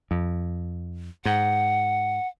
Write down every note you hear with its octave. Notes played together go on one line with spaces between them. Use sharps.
F2
G#2 F#5